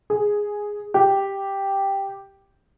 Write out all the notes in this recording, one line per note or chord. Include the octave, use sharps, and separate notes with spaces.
G#4
G4